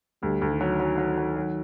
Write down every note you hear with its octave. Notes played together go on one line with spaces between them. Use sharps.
D2 G3
D2
D#3
F#3
F#3
F#3
F#3
F#3